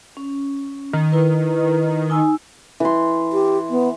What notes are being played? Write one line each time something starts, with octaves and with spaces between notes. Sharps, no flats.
C#4
D#3
E4 B4
D#4 G#5 E6
E3 C6
G4
B3